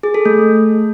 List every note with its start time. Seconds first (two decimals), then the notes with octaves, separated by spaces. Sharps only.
0.03 G#4
0.14 A4
0.25 A3